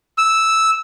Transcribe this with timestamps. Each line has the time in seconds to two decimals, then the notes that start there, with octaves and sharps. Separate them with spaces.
0.18 E6